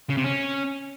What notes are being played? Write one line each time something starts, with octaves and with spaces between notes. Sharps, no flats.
C#3
C3
C#4